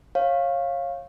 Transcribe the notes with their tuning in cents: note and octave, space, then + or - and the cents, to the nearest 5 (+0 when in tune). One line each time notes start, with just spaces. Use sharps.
C#5 -25 F5 +0